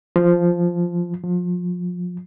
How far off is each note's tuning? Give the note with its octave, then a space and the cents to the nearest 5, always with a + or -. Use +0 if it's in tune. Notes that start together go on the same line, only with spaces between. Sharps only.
F3 -5
F3 +30